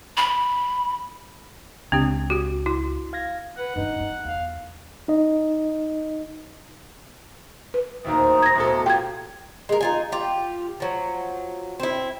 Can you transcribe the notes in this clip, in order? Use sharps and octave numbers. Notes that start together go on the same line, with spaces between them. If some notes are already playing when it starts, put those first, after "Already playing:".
B5
C#2 C4 D4 G4
F#4 G4
E4 F#4
F5 G#6 A#6
B4 F#5
G2 D#3 D#4
C4
E2 F5
D#4 D#5
B4
D1 D#2 D#3 C5 A#5 D#6
G#6 A#6
D1 B2 A4
F4 G4 G5 G#6
G#3 A#4
D#4 F4 G#5
F4 G4
F3 F#3
C4 E4